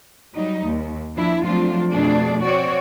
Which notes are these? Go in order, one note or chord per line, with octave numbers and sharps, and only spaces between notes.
F#3 G3 D#4
D#2
F3 D4 E4
F3 F#3 A3 C4 D4 F4
F2 B2 A3 D4 G#4 D5
C4 F#4 C#5 D5